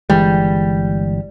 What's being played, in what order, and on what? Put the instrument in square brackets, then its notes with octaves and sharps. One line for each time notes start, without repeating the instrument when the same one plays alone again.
[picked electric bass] G1 E3 G#3 [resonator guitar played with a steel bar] G3